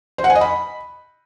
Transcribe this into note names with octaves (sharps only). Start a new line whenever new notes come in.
C5
F#5
G#5
D#5
B5